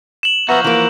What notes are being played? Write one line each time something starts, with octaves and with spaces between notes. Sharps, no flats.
E7 F#7
F3 B3 F#4 E5 A#5
E3 A#3 A#5